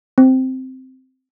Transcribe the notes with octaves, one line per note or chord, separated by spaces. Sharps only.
C4